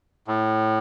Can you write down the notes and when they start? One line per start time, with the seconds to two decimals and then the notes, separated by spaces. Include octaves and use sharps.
0.28 A2